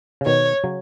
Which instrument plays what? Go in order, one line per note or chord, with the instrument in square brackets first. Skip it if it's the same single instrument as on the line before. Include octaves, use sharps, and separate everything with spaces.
[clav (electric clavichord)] C#3
[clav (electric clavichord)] B2 D#3 [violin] C#5
[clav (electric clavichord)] C#3 F#3